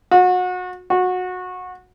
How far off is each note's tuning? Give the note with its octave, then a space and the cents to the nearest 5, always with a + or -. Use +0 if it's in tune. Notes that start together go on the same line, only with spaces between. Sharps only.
F#4 -30
F#4 -20